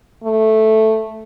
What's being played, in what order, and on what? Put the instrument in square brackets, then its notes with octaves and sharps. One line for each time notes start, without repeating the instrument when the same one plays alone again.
[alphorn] A3